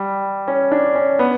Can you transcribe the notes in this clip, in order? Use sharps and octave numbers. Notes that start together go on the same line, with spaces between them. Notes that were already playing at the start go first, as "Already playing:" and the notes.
Already playing: G3
C#4
D4
C#4
B3